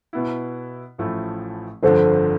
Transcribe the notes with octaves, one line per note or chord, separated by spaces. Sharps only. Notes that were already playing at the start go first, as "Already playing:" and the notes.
B2 B3 E4
A1 A2 F3 A3 E4
G1 F2 D3 F3 A4 C5